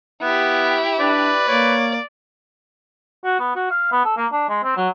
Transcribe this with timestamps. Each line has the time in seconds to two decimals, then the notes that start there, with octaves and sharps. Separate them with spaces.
0.22 B3 E4 G4
0.99 D4 B4 D5
1.48 A#3 C#5 D5
3.24 F#4
3.40 B3
3.56 F#4
3.71 F5
3.92 B3
4.05 A4
4.17 A#3
4.32 D4
4.49 G#3
4.64 C4
4.77 F#3